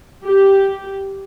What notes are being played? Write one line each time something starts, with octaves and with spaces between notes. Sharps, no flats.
G4